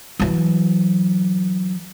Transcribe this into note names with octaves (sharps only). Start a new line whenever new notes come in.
E3 F#3